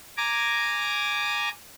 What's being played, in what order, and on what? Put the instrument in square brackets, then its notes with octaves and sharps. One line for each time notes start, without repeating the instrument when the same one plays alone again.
[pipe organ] G#5 A#5 D6